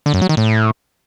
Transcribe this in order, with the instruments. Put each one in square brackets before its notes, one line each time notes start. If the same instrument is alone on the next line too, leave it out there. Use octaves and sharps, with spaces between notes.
[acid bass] D3
F#2
F#3
D#3
A2